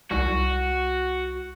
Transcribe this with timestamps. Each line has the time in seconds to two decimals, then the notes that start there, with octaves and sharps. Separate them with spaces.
0.11 C2 F#4